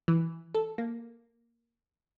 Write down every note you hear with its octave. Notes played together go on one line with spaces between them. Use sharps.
E3
A4
A#3